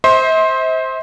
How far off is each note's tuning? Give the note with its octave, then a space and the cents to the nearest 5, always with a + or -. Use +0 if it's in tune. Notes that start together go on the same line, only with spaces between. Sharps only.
C5 +5 E5 -45 C6 +15